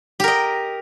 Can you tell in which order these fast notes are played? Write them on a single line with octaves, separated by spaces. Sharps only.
G4 A#4 D#5